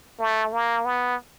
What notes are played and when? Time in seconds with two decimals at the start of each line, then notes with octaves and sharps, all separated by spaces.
0.19 A3
0.53 A#3
0.85 B3